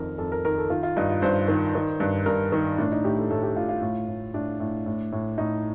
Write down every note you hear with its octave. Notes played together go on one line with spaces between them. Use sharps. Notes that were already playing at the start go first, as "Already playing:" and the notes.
Already playing: F2 D#3 A#4
F2 A4
A#4
D#3 A#4
A4
D#3 F4
F4
G2 D#4
F4
G2 C5
D#3
D#3
G2
G2 A#4
D#3
A2 D4
D#4
A2 G4
A4
A2 A4
G4
A2 F4
F4
A2
A2
A2 D4
A2
A2
A2
A2 D#4